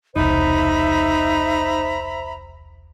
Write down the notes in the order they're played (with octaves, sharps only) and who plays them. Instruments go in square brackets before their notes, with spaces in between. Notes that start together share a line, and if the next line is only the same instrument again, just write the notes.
[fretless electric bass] E1 C2 [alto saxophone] D#4 [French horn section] C5 [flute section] E5 A#5 B5